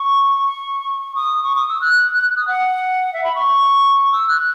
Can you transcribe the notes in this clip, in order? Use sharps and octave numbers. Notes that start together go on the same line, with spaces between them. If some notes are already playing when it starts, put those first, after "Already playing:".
Already playing: C#6
D#6
C#6
D#6
E6
F#6
F#6
D#6
F#5
E5
B5
C#6
E6
F#6